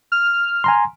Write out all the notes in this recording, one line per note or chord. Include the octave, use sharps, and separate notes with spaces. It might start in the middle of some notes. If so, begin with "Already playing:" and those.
F6
G#5 A#5 C6